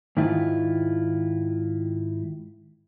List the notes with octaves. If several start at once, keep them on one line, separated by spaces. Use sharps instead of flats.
G#2 D#3 E4 F4